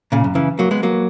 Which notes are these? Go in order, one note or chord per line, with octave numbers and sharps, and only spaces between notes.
A#2 C#3
F#2
C#3 E3
F#3 A#3
G#3 B3
F#3 A#3